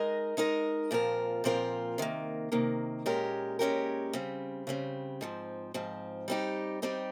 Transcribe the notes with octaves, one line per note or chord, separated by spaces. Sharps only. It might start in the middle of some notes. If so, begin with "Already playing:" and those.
Already playing: G#3 D#4 A#4 D#5
G#3 D#4 A#4 D#5
A#2 F3 C4 F4 A#4
A#2 F3 C4 F4 A#4
C3 D#3 A#3
C3 D#3 A#3
A#2 G#3 C#4 G4 A#4
A#2 G#3 C#4 G4 A#4
C#3 G3 C4
C#3 G3 C4
G#2 F3 C4
G#2 F3 C4
G3 C4 D#4 G4
G3 C4 D#4 G4